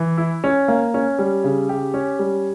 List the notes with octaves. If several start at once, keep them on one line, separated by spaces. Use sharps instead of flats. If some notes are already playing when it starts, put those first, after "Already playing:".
Already playing: E3
E4
C#4
A#3
C#4
G3
C#3
G4
C#4
G3